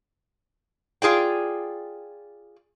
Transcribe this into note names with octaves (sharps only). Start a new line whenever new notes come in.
F4 G#4 D5 G5